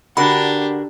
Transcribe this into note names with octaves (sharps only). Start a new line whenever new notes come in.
D3 D4 F#4 G4 A#4 B5